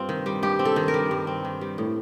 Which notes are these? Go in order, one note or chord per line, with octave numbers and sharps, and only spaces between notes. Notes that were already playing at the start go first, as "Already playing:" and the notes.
Already playing: G2 C4 F4
D#3
G3
G2 G4
C4
A4
D#3
A#4
G3
G2
C4
D#3
G3
A2